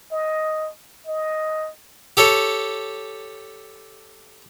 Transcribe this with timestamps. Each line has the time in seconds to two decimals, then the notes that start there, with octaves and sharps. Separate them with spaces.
0.12 D#5
1.07 D#5
2.17 G4 A4 C#5